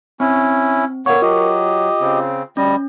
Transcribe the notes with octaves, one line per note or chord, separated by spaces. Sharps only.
C4 C#4 E4
A#2 D3 A#3 B3 A#4 C#5 C#6
F#3 F4 G4 D#5
C#3 C4
D2 G3 C#4 D#5